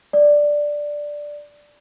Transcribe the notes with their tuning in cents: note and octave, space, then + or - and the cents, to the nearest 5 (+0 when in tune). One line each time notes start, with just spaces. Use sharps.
D5 +0